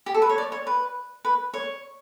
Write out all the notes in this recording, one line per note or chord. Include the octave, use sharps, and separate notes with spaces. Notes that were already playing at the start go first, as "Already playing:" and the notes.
G4
A4
B4
C#5
D5
C#5
B4
B4
C#5